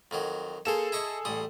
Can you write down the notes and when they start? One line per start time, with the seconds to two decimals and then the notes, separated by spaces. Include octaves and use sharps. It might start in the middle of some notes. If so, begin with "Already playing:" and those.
0.11 F2 D#3 F#3
0.65 A#3 G#4 A4 C5 E7
0.92 E4 D#5 C#6
1.25 A1 G3 D#6